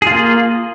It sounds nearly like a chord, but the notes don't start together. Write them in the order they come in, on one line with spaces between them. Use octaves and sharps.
G#4 F4 A#3